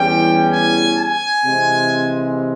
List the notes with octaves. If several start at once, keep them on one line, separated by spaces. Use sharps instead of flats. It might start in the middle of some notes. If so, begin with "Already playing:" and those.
Already playing: E2 E3 G3 C#4 G5
G#5
G#5
C3 E3 G#3 C4